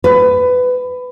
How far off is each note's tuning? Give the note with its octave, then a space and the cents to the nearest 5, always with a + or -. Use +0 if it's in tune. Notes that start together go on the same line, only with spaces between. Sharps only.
B4 +20